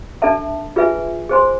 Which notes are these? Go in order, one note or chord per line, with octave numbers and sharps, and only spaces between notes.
D4 A4 E5 A5
F4 G#4 B4 E5 G#5
G#4 C5 G#5 C6